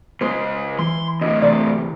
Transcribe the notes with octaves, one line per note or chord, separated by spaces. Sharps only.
C#2 G#3 C5
E3 C6
D2 A2 D#5
C3 E3 C5 D5